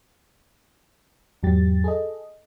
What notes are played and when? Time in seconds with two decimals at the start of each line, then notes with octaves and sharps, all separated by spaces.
1.43 E2 G#2 F#3 G4 A6
1.84 G#4 A4 D#5